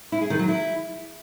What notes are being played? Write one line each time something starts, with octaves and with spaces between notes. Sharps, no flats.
E4
G#4
D#3
F#3
E4